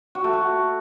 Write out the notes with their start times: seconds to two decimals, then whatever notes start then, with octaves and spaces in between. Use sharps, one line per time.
0.15 F#4
0.24 A3
0.33 F#4